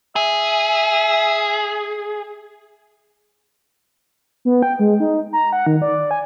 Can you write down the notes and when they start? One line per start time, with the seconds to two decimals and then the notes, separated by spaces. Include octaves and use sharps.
0.16 G#4 E5
4.45 B3
4.63 G5
4.79 G#3
5.00 D#4
5.33 A#5
5.53 F#5
5.67 D#3
5.82 D5
6.11 G#5